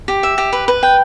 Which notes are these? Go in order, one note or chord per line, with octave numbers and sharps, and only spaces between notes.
G4
E5
G4
B4
B4
G5